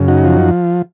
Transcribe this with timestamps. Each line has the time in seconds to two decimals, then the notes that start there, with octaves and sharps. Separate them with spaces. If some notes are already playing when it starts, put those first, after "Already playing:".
Already playing: F#2 C#3
0.08 D#4 F#4
0.24 F3